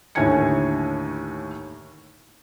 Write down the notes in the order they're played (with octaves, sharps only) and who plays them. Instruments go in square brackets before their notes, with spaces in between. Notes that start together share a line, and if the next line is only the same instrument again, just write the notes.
[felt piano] D#2 A2 D3 G#5 G#6 C#7